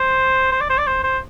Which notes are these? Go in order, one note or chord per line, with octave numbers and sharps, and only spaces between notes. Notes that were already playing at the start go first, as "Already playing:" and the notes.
Already playing: C5
C5
D5
C5
D5
C5
C5